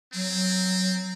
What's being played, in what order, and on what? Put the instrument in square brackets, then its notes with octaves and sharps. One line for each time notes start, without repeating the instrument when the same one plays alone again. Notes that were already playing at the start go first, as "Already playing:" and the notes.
[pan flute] F#3 [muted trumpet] C4